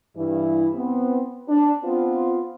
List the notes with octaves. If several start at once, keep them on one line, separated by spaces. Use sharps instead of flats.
G2 E3 E4
B3 C4
D4
B3 C4 F4